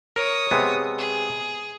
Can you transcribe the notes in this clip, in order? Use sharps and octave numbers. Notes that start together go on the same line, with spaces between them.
A#4 C#5 D#6
C3 G#3 B3
G#4